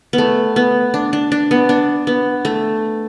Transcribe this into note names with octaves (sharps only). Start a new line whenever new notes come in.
B3
A3
B3
D4
D4
D4
B3
D4
B3
A3